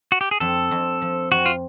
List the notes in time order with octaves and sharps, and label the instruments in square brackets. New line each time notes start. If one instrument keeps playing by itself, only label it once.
[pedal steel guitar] F#4
G4
G#4
[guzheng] F2 [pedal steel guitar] A4
[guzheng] F2
F3
[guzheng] F2 [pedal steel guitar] F#4
[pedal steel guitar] F4